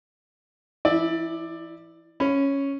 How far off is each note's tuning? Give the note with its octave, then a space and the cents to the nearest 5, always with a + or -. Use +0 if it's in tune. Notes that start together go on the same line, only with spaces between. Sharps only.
E3 +40 E4 -15 D5 +15
C#4 +0 B5 +20